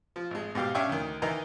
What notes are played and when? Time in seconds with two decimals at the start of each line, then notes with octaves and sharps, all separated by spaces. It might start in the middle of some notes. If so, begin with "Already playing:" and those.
0.16 F3
0.31 G#1 G#3
0.55 G#2 B2 G4 F5
0.75 C#4 D4 E5 F5 G5 C#6
0.89 D2 D#3
1.22 D#3 E3 D#5 A#5